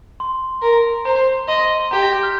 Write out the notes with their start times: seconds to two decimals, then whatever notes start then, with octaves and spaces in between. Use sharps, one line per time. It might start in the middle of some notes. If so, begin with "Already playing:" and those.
0.20 C6
0.62 A#4
1.05 C5 A#5
1.48 D#5 C6
1.91 G4 A#5
2.03 A#6
2.13 G6
2.23 F6